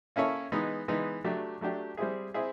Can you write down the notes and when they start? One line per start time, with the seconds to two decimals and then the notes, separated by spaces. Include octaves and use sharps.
0.16 A#3 C#4 E4 A4 C#5
0.52 E3 G#3 B3 D#4
0.88 E3 G#3 B3 D#4
1.24 F#3 A3 D4 G4
1.61 F#3 A3 D4 G4
1.97 G3 C4 E4 G#4
2.34 C4 E4 G#4